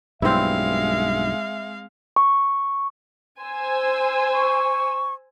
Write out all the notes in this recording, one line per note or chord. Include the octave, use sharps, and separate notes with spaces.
B1 G2 G#3 C4 E4 E5 F5
C#6
C5 G#5 E6
C#6